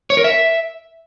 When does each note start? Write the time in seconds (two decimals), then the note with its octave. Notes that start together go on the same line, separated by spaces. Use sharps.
0.10 C#5
0.17 A#4
0.24 E5